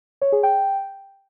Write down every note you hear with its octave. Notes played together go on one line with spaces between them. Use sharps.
C#5
G#4
G5